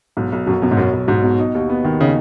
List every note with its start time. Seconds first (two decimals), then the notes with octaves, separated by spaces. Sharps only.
0.17 B1 G#2
0.32 B1
0.47 F#2 B2 F#3
0.62 F#2 B2
0.71 G#2
0.77 B1 F#2
0.93 B1
1.08 G#2 F#3
1.23 B2
1.39 D#4
1.55 D#2
1.70 B3
1.85 D#3
2.01 C#3 D#4